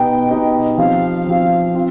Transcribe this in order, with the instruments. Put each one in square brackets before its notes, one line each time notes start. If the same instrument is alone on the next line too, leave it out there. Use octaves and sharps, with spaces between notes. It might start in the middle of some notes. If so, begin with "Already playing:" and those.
Already playing: [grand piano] B2 B3 D#4 G4 [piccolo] G5
[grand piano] B2 B3 D#4 G4
[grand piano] F3 C4 G4 [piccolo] F5
[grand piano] F3 C4 G4
C4 F4